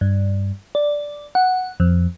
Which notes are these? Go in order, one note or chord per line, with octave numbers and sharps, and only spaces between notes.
G2
D5
F#5
F2